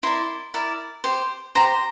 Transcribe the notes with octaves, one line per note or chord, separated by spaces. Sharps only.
E4 A#4 D5 C6
E4 A#4 D5
G4 C5
G4 C5 A#5